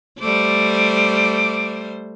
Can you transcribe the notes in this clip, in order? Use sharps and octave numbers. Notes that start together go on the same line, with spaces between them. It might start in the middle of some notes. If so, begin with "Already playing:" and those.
G3 A3 C5 D6